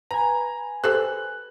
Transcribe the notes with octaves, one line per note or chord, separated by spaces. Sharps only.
B4 G#5 A#5
G4 A4 C5 F#6